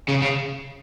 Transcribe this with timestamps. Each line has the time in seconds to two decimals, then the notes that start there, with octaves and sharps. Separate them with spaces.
0.08 C#3
0.22 C#3